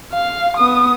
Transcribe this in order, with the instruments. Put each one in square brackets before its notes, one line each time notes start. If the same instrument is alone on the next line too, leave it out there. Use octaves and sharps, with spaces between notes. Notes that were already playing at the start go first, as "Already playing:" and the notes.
[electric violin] F5
B3 D#6